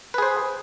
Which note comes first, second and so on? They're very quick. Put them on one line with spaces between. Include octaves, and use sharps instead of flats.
B4 G#4 C5